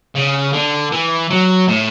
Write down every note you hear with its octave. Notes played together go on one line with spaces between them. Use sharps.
C#3
D3
E3
F#3
A2